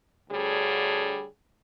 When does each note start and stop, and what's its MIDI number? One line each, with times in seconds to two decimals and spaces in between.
0.30 1.24 38
0.30 1.24 50
0.30 1.24 55
0.30 1.24 68
0.30 1.24 73